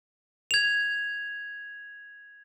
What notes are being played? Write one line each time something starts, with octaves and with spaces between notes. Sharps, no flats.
G#6 F7